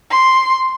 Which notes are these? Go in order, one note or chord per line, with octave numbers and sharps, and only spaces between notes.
C6